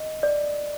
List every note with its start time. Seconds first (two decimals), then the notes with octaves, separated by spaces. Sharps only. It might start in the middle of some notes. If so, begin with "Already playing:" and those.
Already playing: D#5
0.23 D5